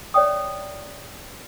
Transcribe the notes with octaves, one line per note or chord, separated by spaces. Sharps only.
C#5 D5 E5 G5 D#6